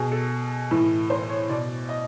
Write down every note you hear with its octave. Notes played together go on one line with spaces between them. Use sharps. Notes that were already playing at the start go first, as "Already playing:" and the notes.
Already playing: B2 G#4
A4
A2 E3
C5
C#5
B2 D5
D#5